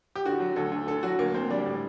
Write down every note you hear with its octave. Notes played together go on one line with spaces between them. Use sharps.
G4
D3 F#4
F#3
D2 A4
D2
D3 A4
F#3 F#4
D2 A#3
D2 C4
G3 D4
A2